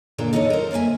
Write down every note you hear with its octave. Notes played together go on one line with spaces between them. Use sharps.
A#2 D3 D4 A#4
D#4 E4 A4 C#5 D#5
A#4 C5
D3 A#3 D5 E5 G#5